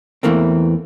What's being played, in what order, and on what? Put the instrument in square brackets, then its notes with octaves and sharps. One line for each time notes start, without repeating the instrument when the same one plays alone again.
[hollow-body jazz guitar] E2 G2 E3 A3 A#3 C4